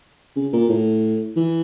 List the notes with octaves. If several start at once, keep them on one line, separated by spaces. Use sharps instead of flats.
C#3
A#2
A2
E3